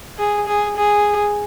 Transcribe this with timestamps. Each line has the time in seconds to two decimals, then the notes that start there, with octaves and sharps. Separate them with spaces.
0.18 G#4
0.47 G#4
0.76 G#4